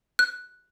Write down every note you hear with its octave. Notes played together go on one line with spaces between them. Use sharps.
F#6